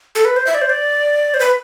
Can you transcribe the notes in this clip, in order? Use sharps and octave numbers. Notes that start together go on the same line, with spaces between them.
A4
B4
C5
E5
D5
C5
D5
C5
B4